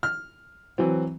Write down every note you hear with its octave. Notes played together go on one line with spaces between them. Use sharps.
F6
E3 F#3 C4